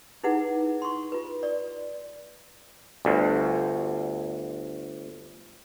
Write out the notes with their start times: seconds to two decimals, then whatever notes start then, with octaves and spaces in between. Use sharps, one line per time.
0.24 D#4 E4 G#4 B4 F#5
0.82 C6 C#6
1.12 F4 B4
1.43 D5
3.05 G1 D2